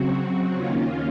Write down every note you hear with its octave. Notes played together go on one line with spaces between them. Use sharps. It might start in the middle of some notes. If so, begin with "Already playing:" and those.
Already playing: C#3 F#3 C4 F#4
D#2 D#3 A#3 C#4 F4